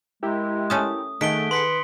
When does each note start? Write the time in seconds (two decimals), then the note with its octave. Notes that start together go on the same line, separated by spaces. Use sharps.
0.23 G#3 E4 G4 A#4
0.70 A3 C#4 A5 D#6
1.21 D#3 A3 G#4 A4 F#5 B6 D7 G7
1.51 B4 C6 B6 C#7